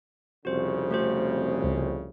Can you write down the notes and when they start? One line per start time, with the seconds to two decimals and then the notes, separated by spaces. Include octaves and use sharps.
0.45 C2 F2 C#3 F#4 C5
0.91 A3 F#4 C5
1.64 C#2